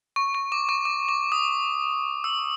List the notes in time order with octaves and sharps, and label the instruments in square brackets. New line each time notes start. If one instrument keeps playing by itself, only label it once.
[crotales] C#6
C#6
D6
C#6
D6
D6
D#6
E6